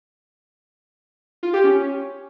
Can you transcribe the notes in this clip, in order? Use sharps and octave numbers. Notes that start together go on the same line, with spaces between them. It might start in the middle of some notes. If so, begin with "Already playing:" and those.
F4
G4
C#4